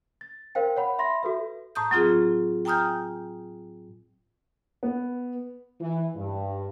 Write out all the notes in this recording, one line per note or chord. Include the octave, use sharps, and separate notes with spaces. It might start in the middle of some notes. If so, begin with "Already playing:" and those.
A6
A#4 C5 F5 G5
C#5 F#5 B5
E5 B5 C6 A#6
F#4 A4 B4 E5
A2 A5 A#5 D#6 G6
F#3 C4 F4 G#4
G5 G#5 A#5 D#6 F6 G6
B3
E3
G2